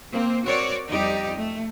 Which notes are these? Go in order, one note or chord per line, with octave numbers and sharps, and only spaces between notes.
A#3 C4
C4 F#4 A#4 C#5 D5
F2 G3 D#4 G4 D5
A3